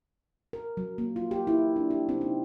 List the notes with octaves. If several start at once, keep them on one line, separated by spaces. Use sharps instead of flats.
A#4
F#3
A#3
F4
G4
E4
D4
G4
C4
D#4